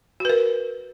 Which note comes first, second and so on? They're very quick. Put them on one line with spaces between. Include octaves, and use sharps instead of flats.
F#4 B4 A#4